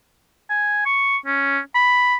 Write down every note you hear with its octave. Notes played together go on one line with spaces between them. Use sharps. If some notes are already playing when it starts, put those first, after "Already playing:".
G#5
C#6
C#4
B5